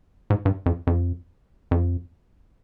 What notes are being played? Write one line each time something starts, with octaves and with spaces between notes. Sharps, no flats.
G#2
G2
F2
F2
F2